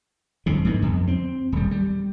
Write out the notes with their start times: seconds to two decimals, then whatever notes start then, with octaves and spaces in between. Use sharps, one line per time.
0.46 G1 F2 C3
0.65 G#2 D3 B3
0.82 F2
1.08 C4
1.52 D#1 G3
1.71 G3